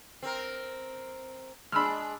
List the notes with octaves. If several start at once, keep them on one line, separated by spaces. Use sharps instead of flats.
C4 A#4
G#3 D4 B5 E6 F6